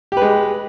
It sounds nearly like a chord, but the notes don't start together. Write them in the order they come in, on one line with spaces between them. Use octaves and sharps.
G4 B4 G#3